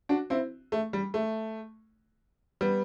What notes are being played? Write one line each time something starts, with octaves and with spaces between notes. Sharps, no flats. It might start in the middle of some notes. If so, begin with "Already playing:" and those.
D4 F#4
C4 E4
A3
G3
A3
G3 B3